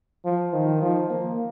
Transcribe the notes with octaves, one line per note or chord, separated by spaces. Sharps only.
F3
D#3
F3
A#3